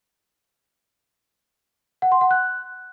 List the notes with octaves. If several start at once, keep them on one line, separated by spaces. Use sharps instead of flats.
F#5
C6
F#5
F#6